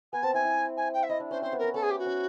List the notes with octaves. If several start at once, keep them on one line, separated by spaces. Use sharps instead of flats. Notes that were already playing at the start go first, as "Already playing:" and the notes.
B3 G#5
C4 A5
E4 G#5
E4
G#5
G5
E5
E4 D#5
D4
C#4 C5
C4 C5
B3
A#4
C#4
C#4 A4
G#4
G4
F#4
C#4